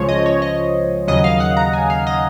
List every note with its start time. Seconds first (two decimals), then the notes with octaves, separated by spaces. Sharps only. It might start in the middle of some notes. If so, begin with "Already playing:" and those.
Already playing: C#2 C#3 F3 G#3 C5 C#5
0.09 D#5
0.26 C#5
0.42 D#5
1.08 D#2 C#3 F#3 D#5
1.24 F5
1.40 F#5
1.57 A#5
1.73 G#5
1.90 F5
2.07 D#5